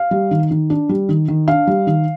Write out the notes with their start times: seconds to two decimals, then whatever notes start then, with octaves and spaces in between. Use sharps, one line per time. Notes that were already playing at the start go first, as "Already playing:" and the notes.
Already playing: F5
0.11 G3
0.31 D#3
0.51 D#3
0.70 D4
0.89 G3
1.09 D#3
1.28 D#3
1.48 D4 F5
1.67 G3
1.87 D#3